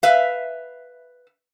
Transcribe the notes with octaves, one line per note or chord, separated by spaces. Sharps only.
B4 E5 F5